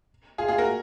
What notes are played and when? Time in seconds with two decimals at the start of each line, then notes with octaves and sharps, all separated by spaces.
0.38 F4 G#4
0.48 F4 G#4
0.58 F#4 A#4